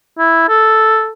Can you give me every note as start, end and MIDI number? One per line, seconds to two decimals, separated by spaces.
0.19 0.48 64
0.49 1.11 69